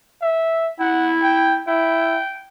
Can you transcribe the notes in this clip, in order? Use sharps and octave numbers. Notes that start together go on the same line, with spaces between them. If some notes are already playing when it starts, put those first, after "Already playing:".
E5
E4 F#5
G5
E4 G5